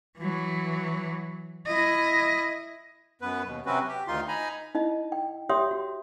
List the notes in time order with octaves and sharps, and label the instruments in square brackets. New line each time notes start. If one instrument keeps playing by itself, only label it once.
[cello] E3 F#3
E4 D#5
[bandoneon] F#2 B3 B4
D#2 B2
C3 F#3 C4 C#4 F#4 B4
G4
D2 D#3 D#4 F4 C6
D#4 G#5 A#5 B5
[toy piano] D#4 E4 D#5
G5
G4 C#5 E5 G5 C6 D#6
F#4